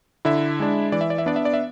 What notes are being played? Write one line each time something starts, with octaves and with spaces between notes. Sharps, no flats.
D3 E4 E5
G#3 D4
E3 D5
E5
D5
E5
B3 D4 D5
E5
D5
E5